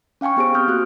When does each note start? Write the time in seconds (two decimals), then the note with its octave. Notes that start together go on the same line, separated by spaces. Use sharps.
0.21 C#4 F5 G5 G#5 C#6
0.37 B3 G4 G#4 C5 D7
0.54 C4 D#6 F6 G6
0.68 A#3 F#4 F#6